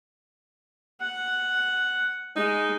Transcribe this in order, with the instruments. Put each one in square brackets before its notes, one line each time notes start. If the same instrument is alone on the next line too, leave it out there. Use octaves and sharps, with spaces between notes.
[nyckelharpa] F#5
[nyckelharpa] G#3 [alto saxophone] D#4